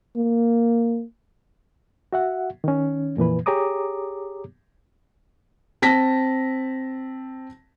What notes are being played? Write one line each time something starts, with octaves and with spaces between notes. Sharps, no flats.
A#3
F#4 E5 F#5
D#3 C#4
F2 A#2 E3 B4
G4 G#4 C#5 A#5 D6 D#6
C4 A5 A#6 B6